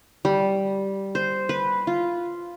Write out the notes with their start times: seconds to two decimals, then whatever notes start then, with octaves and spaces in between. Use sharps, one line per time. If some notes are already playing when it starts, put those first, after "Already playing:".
0.25 G3
1.15 C5
1.49 B4
1.87 F4